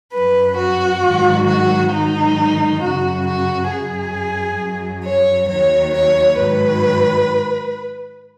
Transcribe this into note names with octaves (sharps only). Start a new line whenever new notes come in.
F#2 F#3 B4
F#4
G#2 D#3 F#3
F#4
G#2 D#3 F#3 D#4
F#2 C#3 F#3 F#4
F#4
F#2 F#3 G#4
F#2 F#3
C#5
D#2 D#3 F#3 C#5
C#5
G#2 D#3 F#3 B4